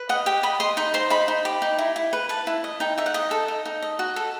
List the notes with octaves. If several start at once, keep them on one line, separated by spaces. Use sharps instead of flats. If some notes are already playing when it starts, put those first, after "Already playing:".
Already playing: B4
D#5 F#5
G4 G5
D#5 B5
D#5 C6
D#4 B5
C5 C6
D#4 B5
D#4
G4
D#4
E4
E4
B4
B4 A5
E4
D#5
D#4 G5
D#4 E5
F#5
D#5
A4
D#4
D#4
D#5
F#4
A4